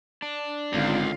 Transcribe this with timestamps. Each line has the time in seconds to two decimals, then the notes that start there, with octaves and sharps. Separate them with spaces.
0.22 D4
0.73 G#1 C#2 D3 F4 F5